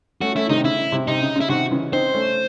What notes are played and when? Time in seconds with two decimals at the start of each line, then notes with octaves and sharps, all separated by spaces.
0.21 A3 C#4 F#4
0.35 A3 C#4 E4
0.50 C3 D#3 D#4
0.64 C#3 E4
0.78 C#3
0.92 C3
1.07 C3 D#4
1.22 C#3
1.36 C#3 E4
1.49 C3 D#3 F#4
1.71 C#3 E3
1.93 C4 D#4 C5
2.13 A3 C#4